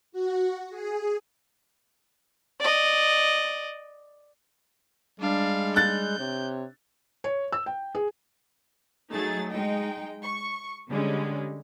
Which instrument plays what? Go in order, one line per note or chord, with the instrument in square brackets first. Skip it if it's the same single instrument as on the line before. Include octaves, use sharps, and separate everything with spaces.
[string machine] F#4
G#4
[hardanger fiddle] D5 D#5
[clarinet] G3 [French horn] G#3 [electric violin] D4 F5
[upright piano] F#6 A6 [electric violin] G6
[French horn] C3 [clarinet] C#5
[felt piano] C#5
E6
G5
G#4
[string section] F#3 A3 D#4 G#4 A6
G#3 D#4 G5
C#6
D3 G3 G#3 C#4